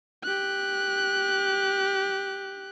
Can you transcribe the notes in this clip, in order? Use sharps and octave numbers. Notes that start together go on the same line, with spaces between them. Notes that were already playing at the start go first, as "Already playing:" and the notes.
G4 F#6